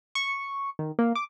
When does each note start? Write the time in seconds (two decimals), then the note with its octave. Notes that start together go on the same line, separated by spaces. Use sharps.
0.15 C#6
0.79 D#3
0.99 A#3
1.15 D6